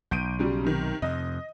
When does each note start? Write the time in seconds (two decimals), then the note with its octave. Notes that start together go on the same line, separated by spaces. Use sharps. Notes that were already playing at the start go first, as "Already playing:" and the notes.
0.11 B1 G6 D7 D#7
0.39 C#3 F#3 G3
0.65 C3 D#3
1.02 F2 C3 D#5